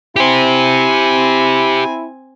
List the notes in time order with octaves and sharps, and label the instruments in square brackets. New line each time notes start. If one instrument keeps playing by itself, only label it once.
[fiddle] C4 G#5 [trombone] E4 [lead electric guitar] G4 C5